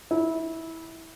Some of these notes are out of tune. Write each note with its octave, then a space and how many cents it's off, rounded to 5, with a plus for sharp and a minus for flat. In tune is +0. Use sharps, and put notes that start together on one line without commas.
E4 -20